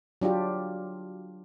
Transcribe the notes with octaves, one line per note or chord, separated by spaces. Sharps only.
F#3 D4 F4 G4